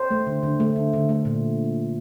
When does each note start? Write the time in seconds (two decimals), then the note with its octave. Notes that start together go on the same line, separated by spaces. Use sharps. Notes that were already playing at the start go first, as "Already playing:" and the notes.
Already playing: C5
0.11 A3
0.27 D3
0.43 D3
0.60 A3
0.76 D3
0.93 D3
1.09 A3
1.25 A#2